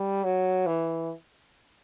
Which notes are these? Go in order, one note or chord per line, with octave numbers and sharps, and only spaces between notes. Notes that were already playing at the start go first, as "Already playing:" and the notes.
Already playing: G3
F#3
E3